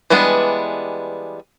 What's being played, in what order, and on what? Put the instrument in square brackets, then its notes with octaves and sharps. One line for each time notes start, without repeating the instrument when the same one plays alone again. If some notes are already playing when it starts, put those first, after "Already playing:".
[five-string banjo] E3 G3 G#3 B3 D4